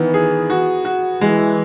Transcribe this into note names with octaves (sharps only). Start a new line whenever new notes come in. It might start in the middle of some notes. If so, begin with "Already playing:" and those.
Already playing: D#3 E3 B3
G#4
F#4
F#4
E3 G#3